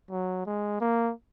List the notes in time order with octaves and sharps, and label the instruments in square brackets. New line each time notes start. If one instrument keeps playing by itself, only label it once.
[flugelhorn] F#3
G#3
A#3